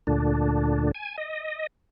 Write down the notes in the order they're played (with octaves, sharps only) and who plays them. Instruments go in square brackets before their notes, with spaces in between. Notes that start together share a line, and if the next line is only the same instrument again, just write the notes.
[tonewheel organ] D2 A#2 D3 D4
G#5
D#5